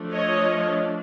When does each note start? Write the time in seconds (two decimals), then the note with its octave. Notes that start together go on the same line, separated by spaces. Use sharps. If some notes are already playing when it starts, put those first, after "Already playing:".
Already playing: F3 A3 D4
0.12 C#5 D#5